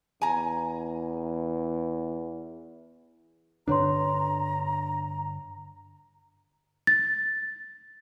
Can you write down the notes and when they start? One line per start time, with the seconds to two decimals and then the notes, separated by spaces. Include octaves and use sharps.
0.22 E2 G#5 A#5
3.68 G2 D3 D4 B4 C#5 A#5 C6
6.87 A6